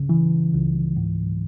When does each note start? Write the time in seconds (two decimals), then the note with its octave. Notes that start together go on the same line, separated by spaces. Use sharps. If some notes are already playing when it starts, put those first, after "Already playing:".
Already playing: C#2 C#3
0.09 E3
0.54 C#2
0.97 G#2